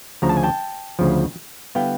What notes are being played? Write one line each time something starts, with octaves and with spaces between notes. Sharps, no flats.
D2 C#3 F3 A#5
A5
G#5
G5 A5
D2 C#3 F3
D3 G3 B3 E4 F5 G5